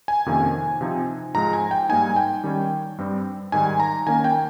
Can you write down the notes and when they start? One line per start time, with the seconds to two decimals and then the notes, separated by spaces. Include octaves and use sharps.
0.08 G#5
0.26 F2 C3 D#3 A#3 C#4
0.81 C3 F3 C4 D#4
1.35 G#2 F3 G#3 A#5
1.53 G#5
1.71 G5
1.89 G#2 G3 A#3 D#4 G#5
2.16 G5
2.44 D#3 G3 C#4
2.98 G2 G3 C4
3.52 G#2 D#3 G3 G#5
3.80 A#5
4.07 D#3 A#3 C#4 G#5
4.24 G5